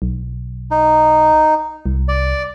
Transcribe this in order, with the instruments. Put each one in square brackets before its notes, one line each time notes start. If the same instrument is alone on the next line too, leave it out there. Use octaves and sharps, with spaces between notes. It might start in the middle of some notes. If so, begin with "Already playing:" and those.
[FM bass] B1
[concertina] D#4
[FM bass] C2
[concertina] D5